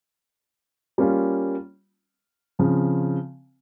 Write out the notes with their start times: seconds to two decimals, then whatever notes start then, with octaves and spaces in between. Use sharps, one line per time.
0.98 G3 A#3 C#4 F4
2.59 C#3 F3 C4